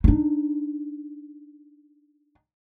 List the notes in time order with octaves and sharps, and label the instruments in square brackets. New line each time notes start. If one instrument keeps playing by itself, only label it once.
[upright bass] D4 D#4